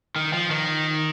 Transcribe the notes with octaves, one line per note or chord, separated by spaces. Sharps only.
D#3
F3
D#3